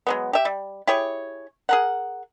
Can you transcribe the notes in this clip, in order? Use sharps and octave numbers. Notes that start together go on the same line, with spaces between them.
F#3 G#3 B3
G4 E5
G3
E4 G4 G#4 C#5
G#4 A#4 F#5